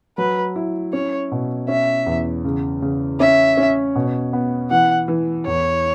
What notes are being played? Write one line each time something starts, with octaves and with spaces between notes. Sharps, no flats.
F#3 B4
E4
C#4 C#5
B2
C#4 E5
E2
C#3
C#3
C#4 E5
C#4
B2
B3
E3 F#5
E3
E2 C#5